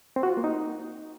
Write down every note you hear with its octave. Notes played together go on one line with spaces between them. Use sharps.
C4
F#4
F4
A#3
D#4